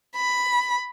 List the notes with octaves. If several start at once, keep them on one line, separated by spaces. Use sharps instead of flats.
B5